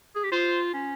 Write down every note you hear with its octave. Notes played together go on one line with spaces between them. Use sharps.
G#4
G4
F4 C5
C#4